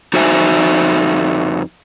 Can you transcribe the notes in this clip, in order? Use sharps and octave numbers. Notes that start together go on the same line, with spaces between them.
F2 D#4 F#4 C5 E5 G#5